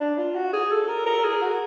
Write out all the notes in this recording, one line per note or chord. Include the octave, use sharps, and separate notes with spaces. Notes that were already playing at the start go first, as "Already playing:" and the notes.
D4
F4
F#4
G#4
A4
A#4
A#4
G#4
F#4